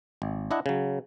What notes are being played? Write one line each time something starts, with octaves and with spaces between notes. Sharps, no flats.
G#1
D4 E4 D#5 F#5
C#3 F#3